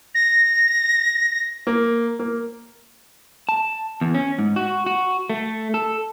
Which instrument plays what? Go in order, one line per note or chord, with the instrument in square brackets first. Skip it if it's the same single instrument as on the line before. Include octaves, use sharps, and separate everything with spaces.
[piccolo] A#6
[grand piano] A#3
A#3
[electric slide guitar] A5
E2
C#4
G#2
F#4
F#4
A3
A4